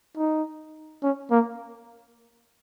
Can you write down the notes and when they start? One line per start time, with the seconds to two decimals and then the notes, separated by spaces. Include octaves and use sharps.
0.18 D#4
1.03 C#4
1.31 A#3